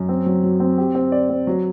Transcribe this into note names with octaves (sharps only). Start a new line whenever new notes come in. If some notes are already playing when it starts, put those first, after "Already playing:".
Already playing: F#2
C4
F#3
F#3
C4
G4
C4
D5
C4
F#3